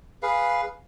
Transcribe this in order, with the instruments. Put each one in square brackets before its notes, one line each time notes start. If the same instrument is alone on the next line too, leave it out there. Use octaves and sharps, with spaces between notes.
[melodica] G#4 B4 F5